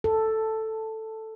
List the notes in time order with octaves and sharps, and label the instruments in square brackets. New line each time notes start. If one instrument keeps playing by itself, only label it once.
[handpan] A4